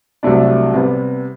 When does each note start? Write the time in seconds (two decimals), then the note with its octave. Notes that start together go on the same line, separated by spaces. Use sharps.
0.23 C2 C3 F#3 A3 D4
0.74 C3 G3 B3